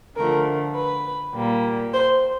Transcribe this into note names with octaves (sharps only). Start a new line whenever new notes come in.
D3 F3 A3 A#4
B4
A#2 G3 A#3
C5